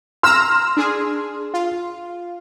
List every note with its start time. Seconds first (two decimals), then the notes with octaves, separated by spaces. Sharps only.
0.23 A#5 C6 E6 F6
0.77 D4 G#4
1.54 F4